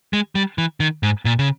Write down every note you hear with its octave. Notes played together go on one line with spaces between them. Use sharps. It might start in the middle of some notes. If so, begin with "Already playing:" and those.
G#3
G3
E3
D#3
G#2
A#2
C#3